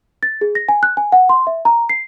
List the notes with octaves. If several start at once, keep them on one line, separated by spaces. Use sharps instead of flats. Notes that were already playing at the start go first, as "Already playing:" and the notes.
A6
G#4
A#6
G#5
F#6
G#5
F#5
C6
E5
A#5
C7